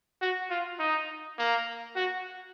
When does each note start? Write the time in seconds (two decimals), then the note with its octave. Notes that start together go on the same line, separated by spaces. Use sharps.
0.21 F#4
0.50 F4
0.79 D#4
1.38 A#3
1.96 F#4